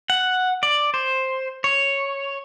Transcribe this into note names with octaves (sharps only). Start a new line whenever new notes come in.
F#5
D5
C5
C#5